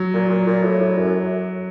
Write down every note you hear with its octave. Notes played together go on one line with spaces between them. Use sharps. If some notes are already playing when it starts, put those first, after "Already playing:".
Already playing: F#3
A#2
A#2
A#2
A2
A2
F#2